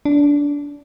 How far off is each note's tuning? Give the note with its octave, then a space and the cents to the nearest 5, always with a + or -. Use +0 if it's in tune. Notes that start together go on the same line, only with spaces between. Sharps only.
D4 -20